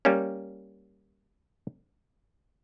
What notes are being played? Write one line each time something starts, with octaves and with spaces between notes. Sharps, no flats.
G3 A#3 C#4